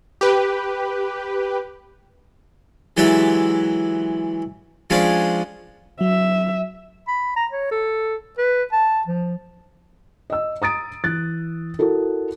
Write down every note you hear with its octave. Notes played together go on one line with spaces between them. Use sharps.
G4 B4
E3 F#3 G#3 G4 D5 E5
F3 G#3 C#4 D4 G#4 D5
F#3 E5
B5
A#5
C#5
A4
B4
A5
F3
D#5 E6
A#5 D#6 A6 D7
E3 F#6 A6
E4 F#4 A4 A#4